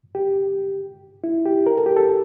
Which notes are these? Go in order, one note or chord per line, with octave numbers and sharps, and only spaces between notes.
G4
E4
G4
A#4
A4
G4
A4